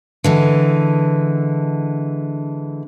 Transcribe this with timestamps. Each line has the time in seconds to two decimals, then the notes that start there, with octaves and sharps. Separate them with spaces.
0.24 D3 E3 G#3